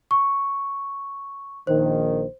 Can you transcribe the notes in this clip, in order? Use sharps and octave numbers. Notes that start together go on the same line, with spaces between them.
C#6
A#1 D#3 C5